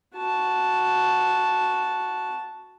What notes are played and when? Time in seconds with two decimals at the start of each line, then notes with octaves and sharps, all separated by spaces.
0.16 F#4 A5